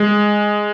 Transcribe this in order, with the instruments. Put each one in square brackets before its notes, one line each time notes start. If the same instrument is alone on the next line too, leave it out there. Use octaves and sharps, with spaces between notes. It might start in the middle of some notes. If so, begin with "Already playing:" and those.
Already playing: [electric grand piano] G#3